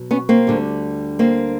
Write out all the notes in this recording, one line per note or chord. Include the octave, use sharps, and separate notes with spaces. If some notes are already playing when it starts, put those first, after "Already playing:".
Already playing: B2 F#3
B3 C#4
A#3 C4
D2 D3 G3
A#3 C4